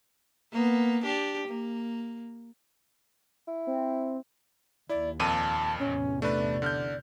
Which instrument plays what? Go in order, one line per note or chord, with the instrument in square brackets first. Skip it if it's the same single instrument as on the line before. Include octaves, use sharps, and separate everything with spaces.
[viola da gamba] A#3 B3
D4 G4
A#3
[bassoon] E4
[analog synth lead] C4
[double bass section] D#2 [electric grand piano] E4 [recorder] D5
[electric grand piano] F2 A#2 D#7 [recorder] A5
[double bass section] A1 E2 C3 [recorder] C#4
[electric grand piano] A3 D4 B4 [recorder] D5
[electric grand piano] D3 F6 G6